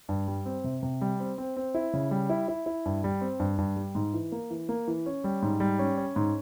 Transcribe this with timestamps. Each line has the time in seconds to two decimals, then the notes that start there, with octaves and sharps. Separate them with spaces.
0.09 G2
0.28 G3
0.46 C4
0.64 C3
0.83 C3
1.01 G3
1.20 C4
1.38 C4
1.57 C4
1.75 E4
1.94 C#3
2.11 G3
2.30 E4
2.48 E4
2.66 E4
2.86 G2
3.04 G3
3.21 C4
3.40 G2
3.58 G2
3.76 G3
3.95 G#2
4.14 E3
4.32 A#3
4.50 E3
4.69 A#3
4.88 E3
5.06 C#4
5.24 G3
5.42 G#2
5.60 G3
5.79 C#4
5.97 C#4
6.16 G#2